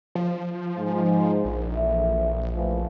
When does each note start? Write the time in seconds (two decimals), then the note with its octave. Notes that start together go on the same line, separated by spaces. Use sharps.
0.15 F3
0.78 G#2
1.45 A#1
1.76 E3 A4 E5
2.54 A2 E3 F3